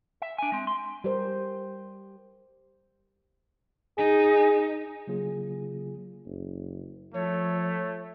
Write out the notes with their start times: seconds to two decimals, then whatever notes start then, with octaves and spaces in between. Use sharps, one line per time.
0.22 E5
0.38 D4 G#5
0.52 G#3 C4
0.67 C6
1.04 G3 G4 A#4 C5
3.98 D#4 G#4
5.07 C#3 F#3 A#3 F4 G#4
6.25 F#1
7.14 F3 A3 C#5